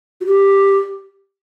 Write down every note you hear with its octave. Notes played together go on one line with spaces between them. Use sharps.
F#4
G4